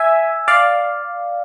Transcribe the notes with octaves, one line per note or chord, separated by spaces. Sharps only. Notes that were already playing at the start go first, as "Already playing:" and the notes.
Already playing: E5 G#5
D5 F5